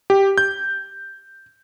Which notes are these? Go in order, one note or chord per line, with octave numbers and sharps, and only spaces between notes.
G4
G6